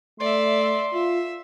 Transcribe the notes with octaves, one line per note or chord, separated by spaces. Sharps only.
A3 D5 E5 C6
F4 E5